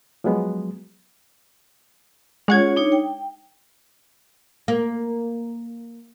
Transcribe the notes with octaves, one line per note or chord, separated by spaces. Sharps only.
F3 F#3 G#3 B3
G#3 C#4 F4 C#5 F#5 G#6
D4 D#4 C#5
G5
A#3